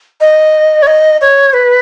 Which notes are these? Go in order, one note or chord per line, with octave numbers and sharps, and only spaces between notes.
D#5
C#5
D#5
C#5
B4